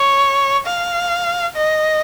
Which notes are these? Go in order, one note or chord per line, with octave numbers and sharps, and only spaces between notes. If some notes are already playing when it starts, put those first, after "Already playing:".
Already playing: C#5
F5
D#5